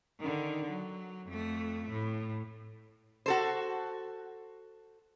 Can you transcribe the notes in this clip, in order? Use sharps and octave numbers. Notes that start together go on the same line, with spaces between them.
D3 D#3
F#3
F2 A3
A2
F#4 A4 C5